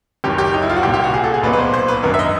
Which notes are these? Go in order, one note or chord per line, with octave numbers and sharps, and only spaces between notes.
F#1 F#2 D#3 G4
G4
D#4
E4
F4
F#4
C2 A#2 G4
G4
F#4
G#4
A4
G#4
B1 A#2 B4
B4
C5
C5
B4
G#1 F#2 D3 A#4
E5
D#5